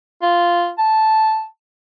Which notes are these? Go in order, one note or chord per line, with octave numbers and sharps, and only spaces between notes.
F4
A5